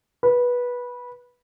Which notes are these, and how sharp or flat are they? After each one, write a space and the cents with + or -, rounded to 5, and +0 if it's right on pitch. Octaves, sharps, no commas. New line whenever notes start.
B4 -15